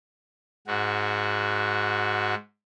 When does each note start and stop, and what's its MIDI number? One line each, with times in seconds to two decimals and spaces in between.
0.67 2.35 44
0.67 2.35 66